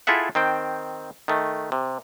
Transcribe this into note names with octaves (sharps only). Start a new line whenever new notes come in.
E4 F4 G#4 A4 E5 F#5
D#3 C4 G5
D#3 A3
C3